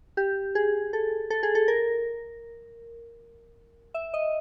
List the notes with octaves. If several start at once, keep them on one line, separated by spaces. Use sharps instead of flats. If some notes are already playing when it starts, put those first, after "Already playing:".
G4
G#4
A4
A4
G#4
A4
A#4
E5
D#5